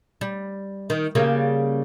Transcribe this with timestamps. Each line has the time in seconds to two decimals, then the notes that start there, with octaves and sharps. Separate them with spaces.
0.21 G3
0.90 D#3
1.15 C#3 G3 A#3